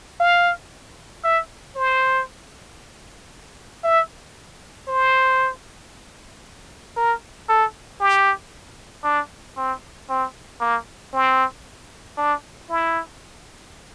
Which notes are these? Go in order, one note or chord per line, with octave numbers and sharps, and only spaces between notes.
F5
E5
C5
E5
C5
A#4
A4
G4
D4
C4
C4
A#3
C4
D4
E4